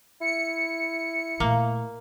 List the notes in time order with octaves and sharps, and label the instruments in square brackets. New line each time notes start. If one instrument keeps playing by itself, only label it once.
[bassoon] E4 [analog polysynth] C#7
[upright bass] A#2 A3 [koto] A#3